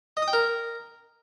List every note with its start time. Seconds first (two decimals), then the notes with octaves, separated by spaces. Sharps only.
0.17 D#5
0.22 D#6
0.28 G5
0.33 A#4